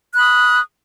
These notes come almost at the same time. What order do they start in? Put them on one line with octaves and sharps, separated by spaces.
F#6 B5 D#6